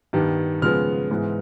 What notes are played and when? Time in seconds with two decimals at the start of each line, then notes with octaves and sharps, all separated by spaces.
0.13 G2 D#3 G3 B3
0.62 C#3 F3 G#3 B3 F6
1.11 G#2 E3 G#3 B3